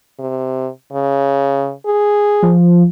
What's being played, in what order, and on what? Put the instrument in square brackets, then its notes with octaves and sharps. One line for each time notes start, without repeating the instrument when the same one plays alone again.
[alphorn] C3
C#3
G#4
[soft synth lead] F3